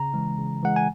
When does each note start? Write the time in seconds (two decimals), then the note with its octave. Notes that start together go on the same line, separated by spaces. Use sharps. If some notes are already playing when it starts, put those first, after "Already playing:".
Already playing: C#3 A#5
0.14 E3 G#3
0.38 C#3
0.63 E3 G#3 F#5
0.76 G#5